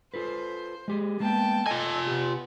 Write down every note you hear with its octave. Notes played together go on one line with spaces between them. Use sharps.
F4 A4 B4 C5
G#3 G4 G#4
G#3 A#3 B3 G5 A5
F4 A4 D#5 G#5
C3 B3 G4